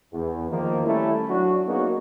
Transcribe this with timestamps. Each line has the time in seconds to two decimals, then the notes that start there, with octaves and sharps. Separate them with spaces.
0.13 E2
0.50 D#3 F3 A#3
0.85 G3 A3 C#4 E4
1.29 F#3 D4 F#4
1.67 A#3 B3 C#4 D#4 F#4 G#4